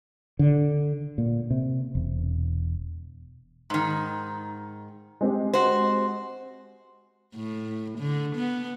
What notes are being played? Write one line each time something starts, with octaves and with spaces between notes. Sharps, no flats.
D3
A#2
C3
E1
G#2 D#3
G#3 C4 G4
F#4 C5
A2
D3
B3